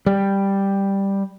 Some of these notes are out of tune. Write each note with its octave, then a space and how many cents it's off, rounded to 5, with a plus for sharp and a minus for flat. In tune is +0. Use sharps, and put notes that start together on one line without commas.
G3 +5